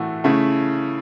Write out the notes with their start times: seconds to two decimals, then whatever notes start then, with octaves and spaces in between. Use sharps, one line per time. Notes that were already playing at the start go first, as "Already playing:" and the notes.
Already playing: A2 E3 A3 F#4
0.24 C#3 A3 E4